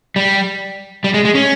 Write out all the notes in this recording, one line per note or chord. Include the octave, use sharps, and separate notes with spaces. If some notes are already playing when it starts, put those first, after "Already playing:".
G3
G3
G#3
G#3
C#4